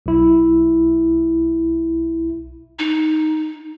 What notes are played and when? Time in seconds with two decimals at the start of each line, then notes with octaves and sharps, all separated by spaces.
0.06 B1 E4
2.79 D#4